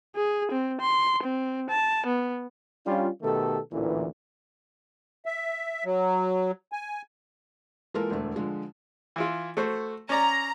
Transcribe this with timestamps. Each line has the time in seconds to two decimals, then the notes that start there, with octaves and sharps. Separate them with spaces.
0.16 G#4
0.51 C4
0.81 C6
1.23 C4
1.70 A5
2.06 B3
2.86 G3 C#4 D4 F4
3.22 B2 D#3 A3 G4 A4
3.72 A1 D2 A#2 E3
5.26 E5
5.84 F#3
6.72 G#5
7.94 E3 G#3 A#3 F4 A4 A#4
8.11 E1 D2 D3 A3
8.36 D3 F3 G#3
9.16 E3 E4 F4
9.57 A3 F#4 C5
10.09 C#4 D5 A#5